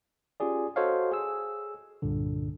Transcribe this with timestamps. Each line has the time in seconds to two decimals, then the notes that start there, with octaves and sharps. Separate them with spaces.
0.40 C#4 F4 G4 G#4 D5
0.76 F#4 A4 C5 C#5 D#5 F5
1.11 G#4 E6
2.02 C2 G2 A#2 D3